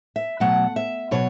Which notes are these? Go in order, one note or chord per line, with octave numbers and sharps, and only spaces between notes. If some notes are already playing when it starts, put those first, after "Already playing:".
E5
B2 F#3 A3 F#5
E5
B2 F#3 C#5